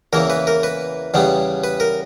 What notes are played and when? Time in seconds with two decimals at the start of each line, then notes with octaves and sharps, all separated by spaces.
0.13 E2 C#3 E3 A#3 A#4
0.30 B4
0.47 A#4
0.63 B4
1.14 E2 C#3 G3 B3
1.64 B4
1.80 A#4